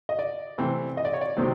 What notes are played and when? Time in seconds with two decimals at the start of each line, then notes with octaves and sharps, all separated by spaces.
0.09 D#5
0.19 D5
0.58 C3 E3 A3 C4
0.97 D#5
1.05 D5
1.13 C#5
1.21 D5
1.37 C3 D#3 F#3 A3 C4